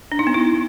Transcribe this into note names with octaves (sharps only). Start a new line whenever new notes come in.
D4
D#4
B3
E4